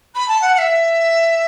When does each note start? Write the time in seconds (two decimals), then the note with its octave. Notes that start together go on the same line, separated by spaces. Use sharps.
0.14 B5
0.28 A5
0.41 F#5
0.55 F#5
0.58 E5